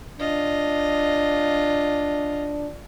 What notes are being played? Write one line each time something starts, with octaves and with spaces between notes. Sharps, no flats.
D4 F4 D#5